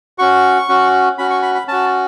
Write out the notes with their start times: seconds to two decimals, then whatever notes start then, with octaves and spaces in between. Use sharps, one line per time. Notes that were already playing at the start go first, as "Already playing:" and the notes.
0.18 C#4 F#4 C#6
0.69 C#4 F#4
1.18 C#4 F#4 B5
1.30 C#6
1.42 B5
1.55 B5
1.67 C#4 F#4 A5